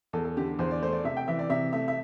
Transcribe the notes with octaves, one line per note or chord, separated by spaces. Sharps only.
E2 A4
A4
D3 G4
E2 C5
D5
A3 C5
D5
C3 E5
G5
E3 E5
D5
C3 E5
A3 E5
E5